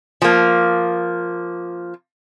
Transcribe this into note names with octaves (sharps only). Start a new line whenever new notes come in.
F3 A#3